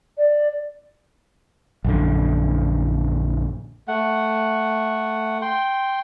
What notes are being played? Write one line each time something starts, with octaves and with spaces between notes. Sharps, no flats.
D5
A#1 F#2 D3
A3 F#5
G5 C6